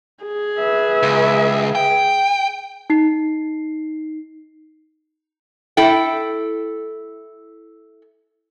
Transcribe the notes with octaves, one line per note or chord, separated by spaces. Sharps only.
G#4
B4 E5
C#2
G5
D#4 C7
E4 A4 G5